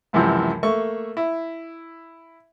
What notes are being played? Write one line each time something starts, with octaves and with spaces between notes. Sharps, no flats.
C#2 F#2 C3 E3 F3
A3 A#3 E5 C#6
E4